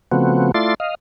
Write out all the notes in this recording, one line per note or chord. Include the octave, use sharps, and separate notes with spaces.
C#3 F3 A3 B3 C4 F#4
A3 E4 F4 D5 C6 A6
D#5 F5